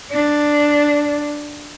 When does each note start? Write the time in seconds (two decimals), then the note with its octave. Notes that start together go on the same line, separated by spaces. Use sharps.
0.11 D4